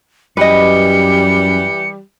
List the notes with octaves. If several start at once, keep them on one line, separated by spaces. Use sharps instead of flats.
F#2 E3 G3 G4 B4 D#5 C#7